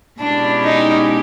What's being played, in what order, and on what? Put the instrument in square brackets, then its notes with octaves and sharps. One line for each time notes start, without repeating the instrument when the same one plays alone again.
[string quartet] B2 G#3 C#4 E4 G4 [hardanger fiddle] D4
[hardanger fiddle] D#4